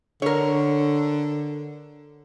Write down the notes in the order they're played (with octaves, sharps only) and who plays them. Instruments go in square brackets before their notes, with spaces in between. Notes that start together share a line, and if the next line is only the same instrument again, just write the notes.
[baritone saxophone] D3 [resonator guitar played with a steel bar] A#4 C#5